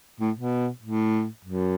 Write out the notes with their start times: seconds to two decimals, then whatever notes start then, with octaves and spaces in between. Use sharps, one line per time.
0.20 A2
0.36 B2
0.82 A2
1.45 F#2